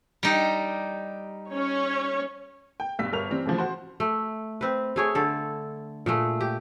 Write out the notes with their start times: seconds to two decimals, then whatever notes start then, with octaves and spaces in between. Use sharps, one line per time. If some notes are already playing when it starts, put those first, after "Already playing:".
0.23 G3 D#4
1.52 C#4 C#5
2.80 G5
2.99 B1 G2 F5 E6 B6
3.13 G1 A#4 F6 F7
3.29 E3 G3 C4
3.45 A2 C#3 E3 F3
3.58 F#4 C5
4.00 A3
4.61 C4 B4
4.96 A3 G#4 C#5
5.15 D3 A4
6.06 A#2 G#3 A3
6.41 G4